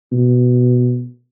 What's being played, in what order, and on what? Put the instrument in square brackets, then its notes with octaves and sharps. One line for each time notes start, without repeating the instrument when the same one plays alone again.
[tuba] B2